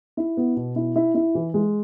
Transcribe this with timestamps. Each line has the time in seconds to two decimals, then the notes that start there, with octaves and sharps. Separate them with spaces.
0.17 E4
0.37 B3
0.56 B2
0.76 E4
0.96 E4
1.15 E4
1.35 E3
1.54 G#3